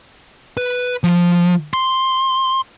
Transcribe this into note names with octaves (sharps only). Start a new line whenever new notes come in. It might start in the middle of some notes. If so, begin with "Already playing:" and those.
B4
F3
C6